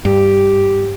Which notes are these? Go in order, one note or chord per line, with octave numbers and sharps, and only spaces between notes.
G2 G4